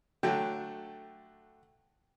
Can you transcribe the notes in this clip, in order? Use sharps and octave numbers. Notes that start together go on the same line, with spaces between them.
D3 F#3 A3 G5